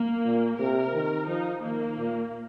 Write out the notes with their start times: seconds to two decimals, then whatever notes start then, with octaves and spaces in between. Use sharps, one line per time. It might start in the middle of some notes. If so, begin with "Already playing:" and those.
Already playing: A#3
0.25 A#2
0.59 C3 A#4
0.94 D#3
1.28 F3 D#4
1.63 D#3 A#3
1.97 A#2